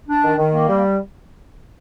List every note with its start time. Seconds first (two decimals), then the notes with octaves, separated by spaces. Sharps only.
0.09 D4
0.24 D#3
0.38 D#3
0.53 A#3
0.69 G3